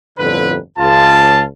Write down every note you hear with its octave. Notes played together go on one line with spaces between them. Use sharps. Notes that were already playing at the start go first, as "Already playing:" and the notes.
G1 F2 A2 D3 B4
C#2 F4 A5